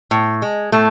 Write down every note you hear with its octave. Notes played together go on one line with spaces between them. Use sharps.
A2
G#3
A2 A3